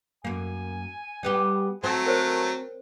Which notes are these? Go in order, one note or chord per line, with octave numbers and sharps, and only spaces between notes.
F#2 A#3 G#5
G3 B3 G4
F#3 A3 C4
A#4 C5 C#5